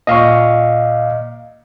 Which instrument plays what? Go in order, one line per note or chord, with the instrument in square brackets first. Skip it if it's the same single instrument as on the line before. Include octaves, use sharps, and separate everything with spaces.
[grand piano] A#2 C#6 [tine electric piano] D#5 F5